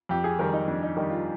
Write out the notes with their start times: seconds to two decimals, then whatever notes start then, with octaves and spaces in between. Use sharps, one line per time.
0.09 F2 G4
0.24 G#4
0.39 D#3 G3 A#4
0.53 D#4
0.68 F2 D4
0.83 D#4
0.97 D#3 G3 D#4
1.10 F4